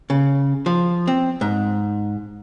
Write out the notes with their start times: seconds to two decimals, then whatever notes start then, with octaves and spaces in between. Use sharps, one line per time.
0.10 C#3
0.66 F3
1.07 C4
1.41 G#2